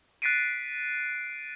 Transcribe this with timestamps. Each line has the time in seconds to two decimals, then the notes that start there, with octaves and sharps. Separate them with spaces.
0.22 F#6 A6 B6 C7 D7 D#7